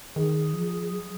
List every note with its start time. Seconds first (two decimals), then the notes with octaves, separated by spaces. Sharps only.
0.16 D#3 G#4
0.53 F3
0.91 F#3